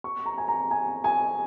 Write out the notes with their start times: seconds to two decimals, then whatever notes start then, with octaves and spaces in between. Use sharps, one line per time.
0.04 C#6
0.26 A#5
0.38 G#5
0.48 A#5
0.71 G#5
1.04 G#5